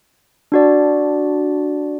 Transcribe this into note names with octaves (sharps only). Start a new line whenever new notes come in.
D4 F#4 D5